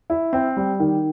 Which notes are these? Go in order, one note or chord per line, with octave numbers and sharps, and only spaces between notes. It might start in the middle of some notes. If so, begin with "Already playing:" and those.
E4
C4
G3
D#3